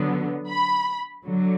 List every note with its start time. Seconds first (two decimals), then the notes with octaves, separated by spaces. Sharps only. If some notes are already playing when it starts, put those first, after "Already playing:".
Already playing: D3 F#3 B3
0.48 B5
1.25 D3 F#3